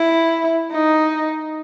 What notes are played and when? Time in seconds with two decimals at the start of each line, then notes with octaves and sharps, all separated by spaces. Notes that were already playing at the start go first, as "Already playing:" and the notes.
Already playing: E4
0.71 D#4